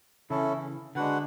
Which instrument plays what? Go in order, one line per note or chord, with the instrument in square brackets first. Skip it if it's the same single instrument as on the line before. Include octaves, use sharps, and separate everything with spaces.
[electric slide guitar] C#3 E3 [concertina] C#4 E4 A4
[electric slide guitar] D3 [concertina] G#3 D4 F#4 B4 F#5